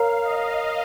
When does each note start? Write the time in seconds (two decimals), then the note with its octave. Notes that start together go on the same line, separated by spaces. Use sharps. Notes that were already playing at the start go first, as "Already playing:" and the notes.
Already playing: A#4 C#5 F5 A#5
0.24 D#5